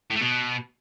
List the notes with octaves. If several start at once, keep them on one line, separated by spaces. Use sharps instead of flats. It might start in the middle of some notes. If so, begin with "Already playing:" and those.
A2
A3
B2